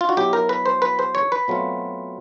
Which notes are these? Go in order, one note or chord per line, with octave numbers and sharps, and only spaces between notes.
F4
F#4
B2 F#3 B3 E4 G4
A#4
B4
C5
B4
C5
C#5
B4
B2 F#3 A3 C4 F4